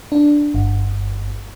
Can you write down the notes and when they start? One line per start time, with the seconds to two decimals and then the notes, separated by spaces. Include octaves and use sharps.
0.12 D4
0.54 G1